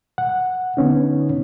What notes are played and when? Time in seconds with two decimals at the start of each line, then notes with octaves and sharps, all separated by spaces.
0.18 F#5
0.77 D3 B3 C#4 D#4